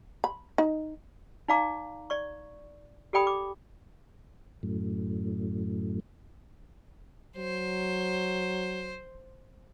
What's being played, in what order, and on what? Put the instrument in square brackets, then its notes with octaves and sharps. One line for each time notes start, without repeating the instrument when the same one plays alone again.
[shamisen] B5
D#4
[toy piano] D#4 D5 F5 A#5 D6
D5 C#6
G4 A4 D5 G5 B5 D#6
D6
[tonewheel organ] F#2 A2
[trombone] F#3 [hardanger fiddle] C5